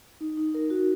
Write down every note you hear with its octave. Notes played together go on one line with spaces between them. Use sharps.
D#4
D#4
A#4
F#4